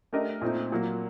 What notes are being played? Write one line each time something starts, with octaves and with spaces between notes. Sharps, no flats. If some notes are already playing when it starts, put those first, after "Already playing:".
A3 D4 G4 A#4 D#5
A#2 A3 C4 D#4
A#2 F#3 A#3